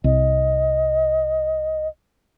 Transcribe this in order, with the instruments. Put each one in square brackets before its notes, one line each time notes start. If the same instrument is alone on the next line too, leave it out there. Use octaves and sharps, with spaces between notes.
[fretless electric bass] C2 [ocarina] D#5